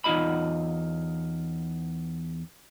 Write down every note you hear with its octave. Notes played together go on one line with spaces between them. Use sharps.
E2 D#4 F4 D#5 B5